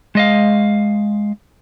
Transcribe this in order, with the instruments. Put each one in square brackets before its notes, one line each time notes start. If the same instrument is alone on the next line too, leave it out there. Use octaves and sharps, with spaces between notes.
[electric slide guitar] G#3 D#5 F5